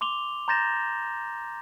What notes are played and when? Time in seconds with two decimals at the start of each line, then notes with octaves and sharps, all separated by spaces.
0.01 C6 D6 F7 G7
0.48 A#5 C6 G6 A6 A#6 E7